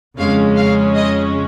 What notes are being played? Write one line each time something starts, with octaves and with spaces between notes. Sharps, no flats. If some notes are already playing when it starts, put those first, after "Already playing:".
F2 C#3 G#3 C#4 F5
F5
D#5